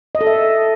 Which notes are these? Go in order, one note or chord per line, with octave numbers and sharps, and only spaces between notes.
D#5
A4
E5